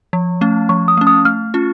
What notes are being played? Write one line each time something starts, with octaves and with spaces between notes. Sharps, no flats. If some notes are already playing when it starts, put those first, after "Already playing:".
F3
A3 C#4
F3 C#6
D#6
A3 C#4
D#6
A3 F6
C#4 F4